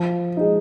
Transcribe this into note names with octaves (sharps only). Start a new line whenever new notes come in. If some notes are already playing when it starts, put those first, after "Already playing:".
Already playing: F3
G#3 D#4